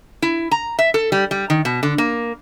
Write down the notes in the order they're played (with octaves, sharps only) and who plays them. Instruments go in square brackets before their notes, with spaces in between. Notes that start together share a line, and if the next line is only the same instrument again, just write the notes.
[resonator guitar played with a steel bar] E4
A#5
E5
A4
G3
G3
D#3
B2
D3
A#3